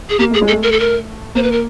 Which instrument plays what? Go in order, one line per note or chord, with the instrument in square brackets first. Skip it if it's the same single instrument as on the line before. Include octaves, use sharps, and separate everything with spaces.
[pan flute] G#4
[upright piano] A#3 [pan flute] G4
[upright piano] A3 [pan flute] G#4
[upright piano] G#3
[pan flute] A4
[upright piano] A3
[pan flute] A#4
A4
A#4
[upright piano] A#3 [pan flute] C5
[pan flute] B4
A#4